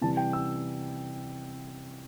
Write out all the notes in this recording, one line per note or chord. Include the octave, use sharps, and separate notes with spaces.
C3 E3 G3 A5
G5
E6